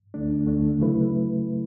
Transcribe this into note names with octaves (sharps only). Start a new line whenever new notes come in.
D2 D3 A3 D4
D2 D3 A3 D4
C#3 F#3 A3 E4 B4